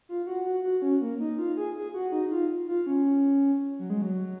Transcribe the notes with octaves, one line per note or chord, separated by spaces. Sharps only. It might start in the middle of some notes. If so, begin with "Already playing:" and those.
F4
F#4
F#4
F#4
C#4
A#3
D#4
F4
G#4
G#4
F#4
D#4
F4
F4
C#4
F#3
G#3
F#3